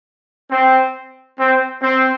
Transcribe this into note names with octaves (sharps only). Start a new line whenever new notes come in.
C4
C4
C4